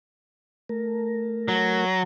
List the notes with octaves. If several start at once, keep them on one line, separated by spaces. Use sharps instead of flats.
A3 A#4
F#3